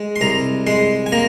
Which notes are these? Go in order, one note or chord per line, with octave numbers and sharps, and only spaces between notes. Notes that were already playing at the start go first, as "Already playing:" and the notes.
Already playing: G#3
C6
C2 A#5
G#3 C6
G#5
A#3 A#5